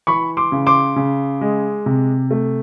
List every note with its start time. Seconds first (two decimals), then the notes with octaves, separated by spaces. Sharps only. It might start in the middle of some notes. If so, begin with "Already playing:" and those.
0.07 E3 B5 C#6
0.37 C6 D6
0.52 C#3
0.67 C6 D6
0.96 C#3
1.41 G#3
1.86 C3
2.31 A3